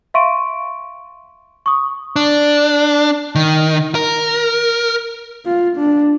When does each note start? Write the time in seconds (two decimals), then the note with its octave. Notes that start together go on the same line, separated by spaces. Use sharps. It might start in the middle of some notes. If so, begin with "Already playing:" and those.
0.14 E5 F5 C6 C#6 D7 D#7
1.66 C#6 D#6
2.16 D4
3.35 D#3
3.95 A#4
5.45 F4
5.77 D4